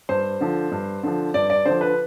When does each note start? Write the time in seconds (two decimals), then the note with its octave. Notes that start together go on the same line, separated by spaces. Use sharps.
0.09 G2 C5
0.41 D3 F3
0.71 G2
1.03 D3 F3
1.34 G2 D5
1.50 D5
1.65 D3 F3 C5
1.81 B4